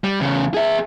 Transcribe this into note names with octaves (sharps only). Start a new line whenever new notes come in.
G3
E2 C#3
G#4 E5